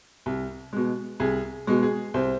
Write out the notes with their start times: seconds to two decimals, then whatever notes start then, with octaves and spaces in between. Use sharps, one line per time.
0.26 C2
0.73 B2 G#3
1.20 C2 G#4
1.67 B2 G#3
1.83 G#4
2.14 C2 C5